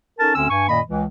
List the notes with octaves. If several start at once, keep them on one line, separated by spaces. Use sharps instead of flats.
C#4 D#4 A4 A#4 A5
D2 D3 C4 C#4 E6
G2 G#5 C#6
F#2 A#2 D#3 A#3 D#5 B5
C#2 E3